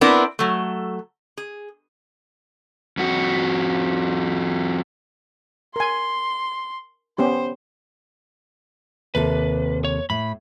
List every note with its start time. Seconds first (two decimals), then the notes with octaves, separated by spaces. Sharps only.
0.01 B3 C4 D4 E4 A#4
0.39 F#3 A3
1.37 G#4
2.97 F2 F#4
5.76 A#4 G#5 C6
7.18 B3 C#4 G4 C5
9.15 D#2 C3 A4 B4
9.85 C#5
10.10 A2 B5